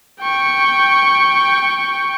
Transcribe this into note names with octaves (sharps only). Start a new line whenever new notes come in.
G5 C#6